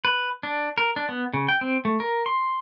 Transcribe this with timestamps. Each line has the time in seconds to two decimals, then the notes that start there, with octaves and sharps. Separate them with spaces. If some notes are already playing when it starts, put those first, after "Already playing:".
0.05 B4
0.43 D4
0.78 A#4
0.96 D4
1.09 B3
1.34 C#3
1.48 G5
1.61 C4
1.85 A3
2.00 A#4
2.26 C6